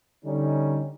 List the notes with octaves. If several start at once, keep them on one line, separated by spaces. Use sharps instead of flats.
D3 G3 C#4 D#4